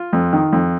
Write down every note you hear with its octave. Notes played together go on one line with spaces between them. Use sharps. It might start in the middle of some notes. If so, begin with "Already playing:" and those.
Already playing: F4
F2
D#3
F2